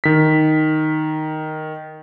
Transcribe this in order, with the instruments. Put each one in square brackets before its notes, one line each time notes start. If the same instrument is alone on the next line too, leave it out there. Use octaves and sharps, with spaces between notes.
[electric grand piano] D#3 B6